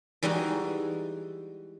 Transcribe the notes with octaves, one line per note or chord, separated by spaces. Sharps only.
E3 G3 G#3 D#4 F#4